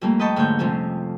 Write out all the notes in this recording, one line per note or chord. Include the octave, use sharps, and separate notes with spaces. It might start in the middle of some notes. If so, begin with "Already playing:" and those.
F2 G3 A3 A#3
B4 D#5 G5 A5 C#6
G#2 D3 A3 A#3 C#5 G6
C3 F3 A3 C4 C#4